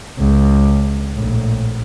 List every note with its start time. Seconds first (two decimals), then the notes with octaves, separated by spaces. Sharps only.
0.19 C#2
1.14 A#1 A2